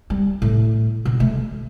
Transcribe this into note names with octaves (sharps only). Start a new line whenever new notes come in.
G3
A2
B2
A3